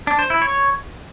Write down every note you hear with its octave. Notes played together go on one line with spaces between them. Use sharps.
D4
C5
E4
C#5